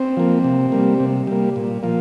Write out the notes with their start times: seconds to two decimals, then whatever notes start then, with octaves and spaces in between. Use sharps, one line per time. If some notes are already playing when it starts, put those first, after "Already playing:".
Already playing: C4
0.17 F3 A#3
0.44 C3
0.72 G3 A#3
1.00 C3
1.27 G3 A#3
1.56 A#2
1.83 F3 A#3